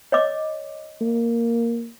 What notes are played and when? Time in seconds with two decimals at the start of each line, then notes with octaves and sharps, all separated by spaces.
0.12 C#5 D#5 D6
1.01 A#3